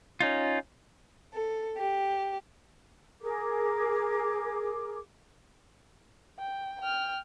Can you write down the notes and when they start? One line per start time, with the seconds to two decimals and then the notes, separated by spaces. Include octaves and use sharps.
0.20 C#4 D#4 F4
1.34 A4
1.77 G4
3.21 G#4 A#4 D6
6.39 G5
6.80 G5 F6